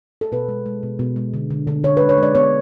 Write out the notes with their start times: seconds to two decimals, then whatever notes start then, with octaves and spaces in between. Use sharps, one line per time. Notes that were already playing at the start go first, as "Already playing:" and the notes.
0.21 A4
0.32 B2 B4
0.48 G#3
0.66 G#3
0.83 B2
0.99 B2
1.16 G#3
1.34 D3
1.50 D3
1.67 D3
1.84 D3 C#5
1.97 B4
2.01 G#3
2.09 C#5
2.18 G#3 D5
2.35 B3 C#5